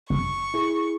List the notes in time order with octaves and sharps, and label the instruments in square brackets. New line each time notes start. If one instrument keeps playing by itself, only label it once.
[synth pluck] G1 [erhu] C#6
[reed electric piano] E4 G#4